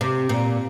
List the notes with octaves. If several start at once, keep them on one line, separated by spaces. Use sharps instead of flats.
C3
A#2